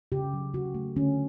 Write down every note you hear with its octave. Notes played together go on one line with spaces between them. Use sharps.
C#3 G4
F#3
C#3 F#4
A3
D3 C#4